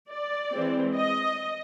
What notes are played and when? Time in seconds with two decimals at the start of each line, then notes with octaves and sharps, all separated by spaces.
0.10 D5
0.53 E3 G#3 C4
0.94 D#5